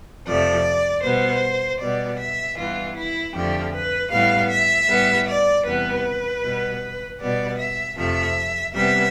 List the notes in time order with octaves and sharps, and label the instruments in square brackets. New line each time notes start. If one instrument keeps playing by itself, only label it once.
[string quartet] F2 C3 F3 A3 D5
B2 G3 B3 C5
B2 G3 B3 D5
E5
G2 E3 B3 F4
E4
F2 D3 F3 A3 G4
B4
A2 G3 B3 F5
E5
A2 G3 B3
D5
E2 C3 G3 B3 B4
B2 G3 B3
B2 G3 B3 D5
E5
F2 C3 F3 A3 E5
C3 G3 B3 E5